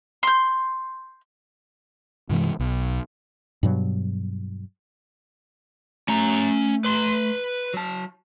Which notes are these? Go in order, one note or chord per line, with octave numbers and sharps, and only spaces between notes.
C6 G6
G2 C3 E3 G#3
B1
G2 B2 F#3
A3 C#4 A#5
B4 C6
F#3 A5